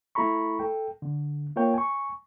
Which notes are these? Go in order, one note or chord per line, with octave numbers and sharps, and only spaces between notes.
A3 E4 A4 A#5 B5 C#6
A4 G5
D3
A#3 F4 A#4 C#5 G5
G#5 C#6